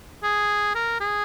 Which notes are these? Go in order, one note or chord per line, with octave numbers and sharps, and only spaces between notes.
G#4
A#4
G#4